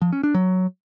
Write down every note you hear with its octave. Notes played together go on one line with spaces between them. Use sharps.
F3
C#4
D4
F#3